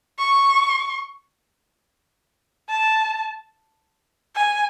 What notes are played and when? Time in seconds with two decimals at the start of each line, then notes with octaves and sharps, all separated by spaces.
0.19 C#6
2.69 A5
4.36 G#5